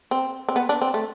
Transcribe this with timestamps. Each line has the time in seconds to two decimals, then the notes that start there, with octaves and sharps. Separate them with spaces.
0.11 C4
0.49 C4
0.56 B3
0.69 D4
0.82 C4
0.94 A3